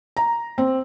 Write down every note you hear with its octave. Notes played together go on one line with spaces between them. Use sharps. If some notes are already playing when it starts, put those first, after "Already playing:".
A#5
C4